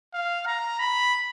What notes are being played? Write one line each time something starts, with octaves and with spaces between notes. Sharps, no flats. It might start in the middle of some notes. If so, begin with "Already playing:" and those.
F5
A#5
B5